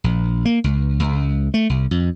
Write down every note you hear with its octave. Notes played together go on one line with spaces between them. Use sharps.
A#1
A#3
C#2
C#2
A3
C2
F2